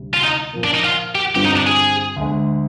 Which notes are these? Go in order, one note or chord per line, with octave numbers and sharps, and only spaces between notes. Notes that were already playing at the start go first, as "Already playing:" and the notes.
Already playing: D2 C3 G3
F4
D#4
A#2 F3 A#3
D4
D#4
F4
G4
G2 D3 G3 C4 F4 G4
D#4
D4
G#4
D2 D3 G#3